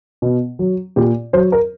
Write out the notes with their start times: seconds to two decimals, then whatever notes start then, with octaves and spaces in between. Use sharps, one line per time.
0.22 B2
0.59 F#3
0.96 A#2 G4
1.33 F#3 C5
1.52 A#4